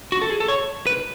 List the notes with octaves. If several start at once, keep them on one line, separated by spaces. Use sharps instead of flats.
F#4
A4
G#4
A4
C#5
B4